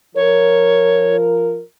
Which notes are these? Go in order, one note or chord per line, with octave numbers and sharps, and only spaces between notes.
F3 A#4 C#5